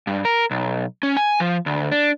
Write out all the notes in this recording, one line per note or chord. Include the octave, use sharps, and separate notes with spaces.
G2
A#4
B1
C#4
G#5
F3
D2
D4